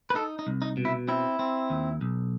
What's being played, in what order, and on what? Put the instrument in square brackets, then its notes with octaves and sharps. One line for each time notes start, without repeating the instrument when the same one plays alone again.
[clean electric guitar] B4
D#4 A4
D#4
C2
D#4
B2
E4
C4 E4
C4
D#2
B1